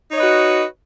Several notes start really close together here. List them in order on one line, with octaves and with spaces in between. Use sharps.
D#4 C#5 D#5 B4 F#4